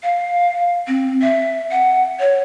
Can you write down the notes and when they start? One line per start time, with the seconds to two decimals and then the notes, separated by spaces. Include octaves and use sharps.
0.03 F5
0.88 C4
1.22 E5
1.71 F#5
2.20 C#5